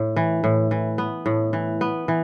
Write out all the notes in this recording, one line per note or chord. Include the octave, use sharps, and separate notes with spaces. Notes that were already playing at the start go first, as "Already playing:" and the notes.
Already playing: A2
E3
A2
E3
B3
A2
E3
B3
E3